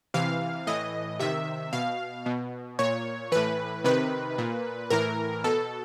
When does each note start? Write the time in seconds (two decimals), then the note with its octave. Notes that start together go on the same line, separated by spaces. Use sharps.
0.14 C3 E3 F5
0.67 A2 E3 D#5
1.19 C3 D#3 E5
1.73 B2 F5
2.26 B2
2.79 A#2 C#5
3.32 A2 E3 B4
3.84 C3 D#3 B4
4.38 A#2
4.90 A2 E3 A#4
5.44 B2 A4